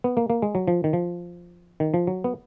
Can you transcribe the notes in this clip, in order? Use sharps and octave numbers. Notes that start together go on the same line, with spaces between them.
B3
A#3
A#3
G#3
F#3
F3
D#3
F3
D#3
F3
F#3
B3